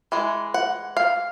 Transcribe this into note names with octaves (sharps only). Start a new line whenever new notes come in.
E3 G#3
F#5
F5